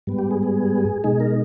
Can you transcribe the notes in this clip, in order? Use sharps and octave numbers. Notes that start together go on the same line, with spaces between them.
G#2 G3 B3
G4
G#4
G#4
B2 G#3 D#4 G#4
A#4